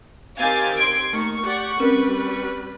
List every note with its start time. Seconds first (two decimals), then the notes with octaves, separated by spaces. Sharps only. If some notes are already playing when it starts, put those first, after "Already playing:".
0.37 D#3 C4 G4 F5 G#5 A6
0.75 C6 G#6 D7
1.13 D#3 A3 A#3 C#6
1.43 G4 D5 F#5
1.80 G3 C4 C#4 A#4 B4